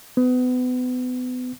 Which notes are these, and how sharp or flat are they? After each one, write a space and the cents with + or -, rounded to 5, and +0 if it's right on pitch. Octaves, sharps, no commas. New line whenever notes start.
B3 +30